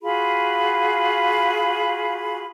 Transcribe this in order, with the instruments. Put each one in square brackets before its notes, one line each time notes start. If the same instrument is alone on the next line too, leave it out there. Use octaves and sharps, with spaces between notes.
[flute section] F4 F#4 G#4 B5